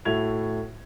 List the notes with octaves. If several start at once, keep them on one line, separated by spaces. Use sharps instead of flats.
A2 E4 F#4 G#6 F7